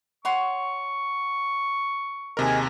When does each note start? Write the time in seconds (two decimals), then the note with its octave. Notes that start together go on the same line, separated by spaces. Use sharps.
0.25 C#5 F#5 C6 C#6
2.37 D#2 C3 G#4 A#4 D#5